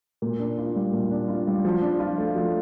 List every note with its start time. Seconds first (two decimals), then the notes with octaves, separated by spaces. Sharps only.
0.22 A#2
0.39 D4
0.58 F4
0.76 G3
0.93 A#2
1.11 D4
1.28 F4
1.47 G3
1.65 F3
1.82 D4
1.99 F4
2.18 A3
2.35 F3